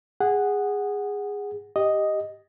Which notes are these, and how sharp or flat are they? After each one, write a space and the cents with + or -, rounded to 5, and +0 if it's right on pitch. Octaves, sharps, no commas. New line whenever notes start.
G#4 -15 F#5 +0
G4 +0 D#5 +0